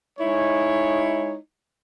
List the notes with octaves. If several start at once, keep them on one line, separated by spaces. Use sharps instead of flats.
G#3 D#4 E4 C#5